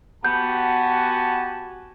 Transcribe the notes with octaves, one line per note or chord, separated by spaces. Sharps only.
B3 F#4 G4 G#5 A5 G6